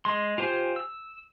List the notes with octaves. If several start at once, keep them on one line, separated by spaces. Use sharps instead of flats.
G#3 C6
F4 G4 C5 G#5
E6